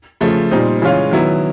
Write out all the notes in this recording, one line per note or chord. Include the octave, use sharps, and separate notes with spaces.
C#3 F3 A3
A#2 G3 C4 D#4
C#3 E3 G#3 C#4 F4
D#3 F#3 B3 E4